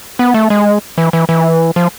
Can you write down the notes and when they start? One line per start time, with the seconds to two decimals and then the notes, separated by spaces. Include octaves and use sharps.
0.19 B3
0.34 A3
0.50 G#3
0.98 E3
1.13 E3
1.29 E3
1.76 F3